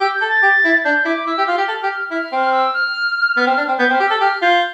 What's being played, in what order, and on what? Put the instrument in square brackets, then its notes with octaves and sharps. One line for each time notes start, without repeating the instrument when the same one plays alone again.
[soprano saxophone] G4 [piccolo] E6
[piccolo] G6
[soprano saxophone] A4
[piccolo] A6
[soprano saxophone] G4
E4
[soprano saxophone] D4 [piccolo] G6
[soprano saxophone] E4 [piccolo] D6
[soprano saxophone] E4 [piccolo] E6
[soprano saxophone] G4
[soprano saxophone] F4 [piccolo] F6
[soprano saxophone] G4
A4
G4
[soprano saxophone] E4 [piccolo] F6
[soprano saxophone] C4
[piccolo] E6
F6
[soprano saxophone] B3
C4
D4
C4
[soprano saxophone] B3 [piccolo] G6
[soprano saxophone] C4
[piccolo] F6
[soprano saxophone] G4
[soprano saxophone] A4 [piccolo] E6
[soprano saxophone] G4 [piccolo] F6
[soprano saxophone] F4 [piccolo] G6